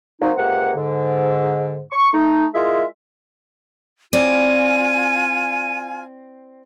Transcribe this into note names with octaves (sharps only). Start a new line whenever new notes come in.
F#3 A#3 C4 D#4
C#2 C3 A#3 F#5
G#2 D3
C#6
A3 D#4
G#3 E4 F4 G#4 A#4 E5
C4 E4 F4 D5 G#5 D#7